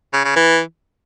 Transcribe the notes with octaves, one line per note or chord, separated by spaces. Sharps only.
C#3
C#3
E3